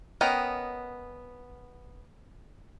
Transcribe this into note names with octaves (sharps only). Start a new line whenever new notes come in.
B3 C#4 A#4 D#5 G5